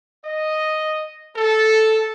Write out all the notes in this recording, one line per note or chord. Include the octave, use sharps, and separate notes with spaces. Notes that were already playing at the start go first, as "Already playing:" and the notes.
D#5
A4